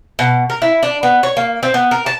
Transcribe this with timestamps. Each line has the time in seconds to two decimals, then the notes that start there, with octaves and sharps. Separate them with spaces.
0.19 B2
0.50 A#4
0.62 E4
0.83 D4
1.03 B3
1.23 C#5
1.37 A#3
1.63 C4
1.74 B3
1.91 A#4
2.06 A5